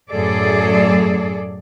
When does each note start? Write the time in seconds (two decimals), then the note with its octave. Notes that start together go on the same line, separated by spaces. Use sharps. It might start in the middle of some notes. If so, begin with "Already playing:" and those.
0.12 F#2 A2 G#4 A4 D5